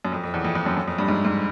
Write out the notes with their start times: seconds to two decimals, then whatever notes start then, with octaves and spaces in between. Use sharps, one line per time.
0.05 F#2
0.12 F2
0.24 F2
0.34 E2
0.45 F2
0.55 F2
0.66 F#2
0.77 F#2
0.88 F2
0.98 G2
1.08 G#2
1.25 G#2